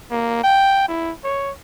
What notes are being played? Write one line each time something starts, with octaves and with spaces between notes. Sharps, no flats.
A#3
G5
E4
C#5